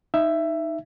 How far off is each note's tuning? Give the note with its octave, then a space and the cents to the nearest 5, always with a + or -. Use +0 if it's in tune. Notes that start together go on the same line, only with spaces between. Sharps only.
D#4 +0 E5 +15